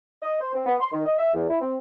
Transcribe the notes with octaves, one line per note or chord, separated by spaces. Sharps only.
D#5
C5
C4
B3
C6
D#3
D#5
E5
E2
E4
C4